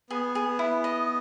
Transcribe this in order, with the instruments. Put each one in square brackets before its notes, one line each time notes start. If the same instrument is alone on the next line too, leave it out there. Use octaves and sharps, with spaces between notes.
[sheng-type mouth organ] B3 [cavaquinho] G#4
[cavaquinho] G#4
E4
D#5